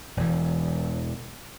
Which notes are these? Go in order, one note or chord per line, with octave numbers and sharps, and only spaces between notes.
E1 E3